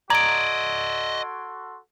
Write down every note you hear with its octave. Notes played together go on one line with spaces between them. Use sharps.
F#4 A4 D5 D#5 A#5 C6 G#6 D7